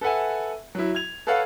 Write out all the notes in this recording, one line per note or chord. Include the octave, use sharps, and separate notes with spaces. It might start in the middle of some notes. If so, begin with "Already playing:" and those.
A4 B4 E5 F#5 G#5
F#3 E4
G#6 F7
A4 B4 C#5 F5 F#5